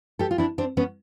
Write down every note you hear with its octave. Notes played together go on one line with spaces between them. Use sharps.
G4 A4
F4
D4 E4
C4 D4
B3 C#4